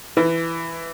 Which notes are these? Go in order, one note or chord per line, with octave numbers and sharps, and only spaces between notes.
E3